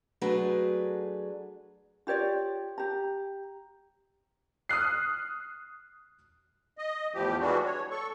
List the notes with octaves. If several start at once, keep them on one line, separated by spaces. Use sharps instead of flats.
F#3 A3 D4 G#4 B4
F4 G4 C#5 D5
G4 A#5
D#6 F6 F#6 C7
D#5
E2 A2 F3 G4
E3 G3 G#3 B3 D4 F#4
C#5
A4 C#6